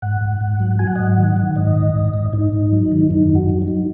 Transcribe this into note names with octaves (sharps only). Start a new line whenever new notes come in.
G#2 F#5
G#2
G#2
F#3
F#3 G#5
F#5
D#5
G#2 F#5
D#3
D#3
G#2 D#5
G#2
G#2
G#2
G#2 D#4
G#2
F#3
D#3
F#2 D#4
F#2
F#4
F#3
D#4
F#3